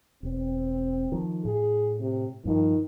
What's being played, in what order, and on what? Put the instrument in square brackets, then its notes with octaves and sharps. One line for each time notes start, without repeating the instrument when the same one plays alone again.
[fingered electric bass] E1 [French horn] C4
[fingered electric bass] D#3 F3
[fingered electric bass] A2 [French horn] G#4
[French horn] C3
[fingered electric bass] G2 F3 [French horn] D#3